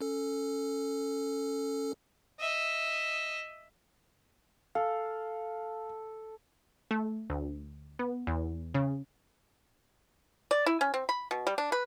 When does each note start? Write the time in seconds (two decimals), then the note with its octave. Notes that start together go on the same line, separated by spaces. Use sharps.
0.01 C#4 A4
2.40 D#5 E5
4.75 A4 F5
6.91 A3
7.30 D2
7.99 B3
8.27 E2
8.75 C#3
10.51 D5
10.66 E4
10.81 C#4
10.94 C4
11.09 B5
11.31 B2
11.47 G3
11.58 D4
11.72 B4